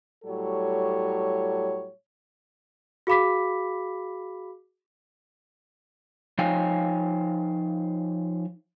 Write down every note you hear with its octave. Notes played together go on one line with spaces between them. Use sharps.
A2 F#3 G3 A4 C#5
F#4 G#4 F5 B5 D6 B6
F3 D#4 C#5 F5 G5 G#5